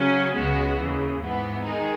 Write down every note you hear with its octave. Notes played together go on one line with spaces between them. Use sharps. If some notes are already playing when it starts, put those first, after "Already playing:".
Already playing: C#3 F#3 C#4
C#2 C#3 G#3 B3 F#4
D#2 C#3 E3
G#2 E3 B3
D#3 G#3 D#4 G#4